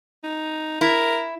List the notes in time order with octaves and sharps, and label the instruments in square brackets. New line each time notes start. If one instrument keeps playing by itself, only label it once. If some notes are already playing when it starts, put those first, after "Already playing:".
[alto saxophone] D#4
[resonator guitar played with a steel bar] E4 [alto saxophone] A#4